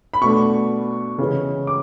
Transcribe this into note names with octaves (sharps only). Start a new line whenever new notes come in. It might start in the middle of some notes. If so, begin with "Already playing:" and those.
B5
B2 A3 D4 C#6
C#3 E3 G#3
D6